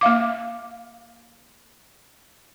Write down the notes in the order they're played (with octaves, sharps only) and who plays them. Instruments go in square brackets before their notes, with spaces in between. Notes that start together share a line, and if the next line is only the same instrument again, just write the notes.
[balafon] A#3 E5 F5 D6